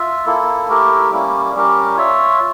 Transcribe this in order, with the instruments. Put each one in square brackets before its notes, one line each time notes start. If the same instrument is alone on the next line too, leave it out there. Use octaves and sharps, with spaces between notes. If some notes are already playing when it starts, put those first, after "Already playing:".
Already playing: [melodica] F4 E5
A#3 E4 A4
A3 E4 G4 A#4
G3 A#3 C#4 E4
G3 C#4 G4 A#4
F4 C#5 E5